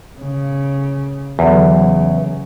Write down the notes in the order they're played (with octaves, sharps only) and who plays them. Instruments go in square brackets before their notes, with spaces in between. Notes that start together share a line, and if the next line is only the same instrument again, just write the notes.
[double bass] C#3
[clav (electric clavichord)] E2 [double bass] D3 F#3
[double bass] C#3